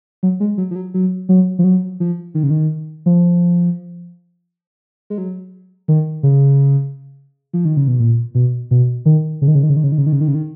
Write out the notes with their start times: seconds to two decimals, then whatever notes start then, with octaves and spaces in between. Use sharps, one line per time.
0.23 F#3
0.40 G#3
0.58 F#3
0.71 F3
0.76 F#3
0.94 F#3
1.29 F#3
1.59 F3
1.64 F#3
2.00 F3
2.35 D#3
2.43 C#3
2.50 D#3
3.06 F3
5.10 G#3
5.18 F#3
5.88 D#3
6.23 C#3
7.53 F3
7.65 D#3
7.77 C#3
7.88 B2
8.00 A#2
8.35 B2
8.71 B2
9.06 D#3
9.42 C#3
9.48 D#3
9.55 C#3
9.63 D#3
9.70 C#3
9.77 D#3
9.84 C#3
9.92 D#3
9.98 C#3
10.06 D#3
10.12 C#3
10.21 D#3
10.28 C#3
10.35 D#3